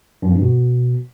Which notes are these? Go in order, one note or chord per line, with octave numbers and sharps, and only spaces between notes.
F#2
F2
G2
B2